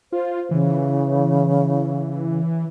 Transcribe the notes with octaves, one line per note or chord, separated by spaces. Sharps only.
F4 C5
C#3 E3